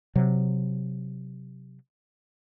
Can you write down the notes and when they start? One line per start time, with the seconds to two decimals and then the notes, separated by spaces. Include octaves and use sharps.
0.15 C3 F#3